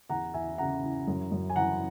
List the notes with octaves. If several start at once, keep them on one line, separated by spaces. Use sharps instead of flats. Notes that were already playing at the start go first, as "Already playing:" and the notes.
E2 F#5 A#5
E2 E5 G#5
C#3 F#5 A#5
E3
F#2
F#2
G#5
E3 F#5 A#5